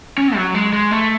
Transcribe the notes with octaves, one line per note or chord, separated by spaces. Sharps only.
C#4
F#3
G#3
G#3
A3